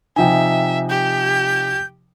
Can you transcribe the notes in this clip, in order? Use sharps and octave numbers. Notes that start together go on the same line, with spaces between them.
C3 F3 D#4 E5 G5 G#5
G4 G6